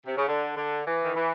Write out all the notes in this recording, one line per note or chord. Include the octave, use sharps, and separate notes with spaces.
C3
C#3
D3
D3
E3
D#3
E3